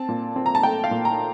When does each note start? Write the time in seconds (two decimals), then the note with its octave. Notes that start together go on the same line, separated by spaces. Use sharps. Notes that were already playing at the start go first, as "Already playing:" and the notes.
Already playing: C4 A5
0.09 A#2
0.36 C4
0.46 A#5
0.55 A5
0.63 A3 G5
0.84 F5
0.91 A#2
1.05 A#5